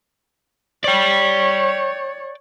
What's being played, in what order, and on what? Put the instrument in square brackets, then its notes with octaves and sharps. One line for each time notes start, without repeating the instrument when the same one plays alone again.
[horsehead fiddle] C#5 [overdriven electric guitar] D5 G5